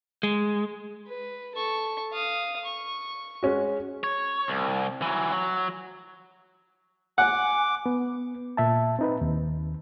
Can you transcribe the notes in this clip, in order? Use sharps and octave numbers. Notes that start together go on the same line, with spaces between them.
G#3
B4
A4 C#6
F5 D#6
C#6
G#3 C#4 F#4
C#5
C2
E3 F#3
F#3
F#5 G#5 D6
B3
A#2 E5 A5
C4 D#4 B4
D#2